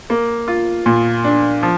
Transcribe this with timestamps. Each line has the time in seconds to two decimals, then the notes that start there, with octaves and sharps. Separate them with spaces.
0.10 A#3
0.48 F4
0.86 A#2
1.24 D4
1.63 F3